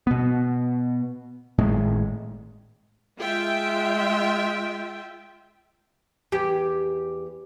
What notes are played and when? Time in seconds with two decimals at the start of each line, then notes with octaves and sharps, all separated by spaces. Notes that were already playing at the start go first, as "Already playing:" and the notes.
0.07 B2 B3
1.58 G#1 A2 G#3
3.19 G#3 F4 E5 G5
6.32 E2 G4